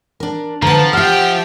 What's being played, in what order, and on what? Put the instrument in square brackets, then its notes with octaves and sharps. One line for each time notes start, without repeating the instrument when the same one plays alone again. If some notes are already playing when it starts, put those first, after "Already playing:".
[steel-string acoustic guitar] D4 A#4
[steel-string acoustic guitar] D3 B3 [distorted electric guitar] F3 [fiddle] B4 A5 [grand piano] A#5
[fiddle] G4 G5 [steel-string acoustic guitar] E5 F#5 [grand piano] F6